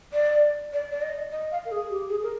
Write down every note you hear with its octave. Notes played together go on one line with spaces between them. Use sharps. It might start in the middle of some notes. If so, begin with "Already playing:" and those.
D5
D5
D5
D#5
D#5
F5
A#4
G#4
G4
G#4
A#4